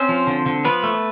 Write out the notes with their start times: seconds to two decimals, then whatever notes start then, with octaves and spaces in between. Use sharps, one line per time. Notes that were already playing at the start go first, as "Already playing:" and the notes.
Already playing: C4 C#4 C5
0.09 F3
0.27 D3
0.46 D3
0.65 F3 B3 B4
0.83 A3